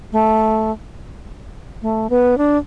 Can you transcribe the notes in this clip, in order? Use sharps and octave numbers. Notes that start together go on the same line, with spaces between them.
A3
A3
B3
D4